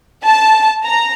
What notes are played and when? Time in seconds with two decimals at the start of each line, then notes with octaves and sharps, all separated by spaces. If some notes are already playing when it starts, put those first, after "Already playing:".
0.23 A5
0.83 A#5